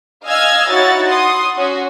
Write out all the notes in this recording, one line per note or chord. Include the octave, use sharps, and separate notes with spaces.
D#5 F5 G#5 E6 F6 G#6
D#4 E4 F#4 C#5 F#5 A6
F#5 C6 D#6
C#4 F#4